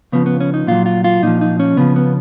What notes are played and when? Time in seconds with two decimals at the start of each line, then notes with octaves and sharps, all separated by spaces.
0.12 C#3 F3 B3
0.26 B3
0.40 C#4
0.54 D#4
0.67 A#2 F#3 F4
0.86 F4
1.04 F4
1.23 A#2 F3 D#4
1.41 D#4
1.60 C#4
1.77 C#3 F3 B3
1.96 B3